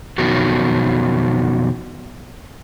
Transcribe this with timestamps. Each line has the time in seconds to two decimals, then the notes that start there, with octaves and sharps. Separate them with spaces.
0.18 F2 B2 D#3 F#3